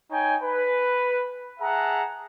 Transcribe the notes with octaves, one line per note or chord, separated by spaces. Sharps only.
D#4 C#5 G5 G#5
B4
G#4 E5 F#5 A5 A#5